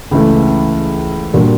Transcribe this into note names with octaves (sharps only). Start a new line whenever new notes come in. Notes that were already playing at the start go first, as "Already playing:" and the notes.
C#2 C#3 E3 A3
A#2 G3 A#3 D4 F#4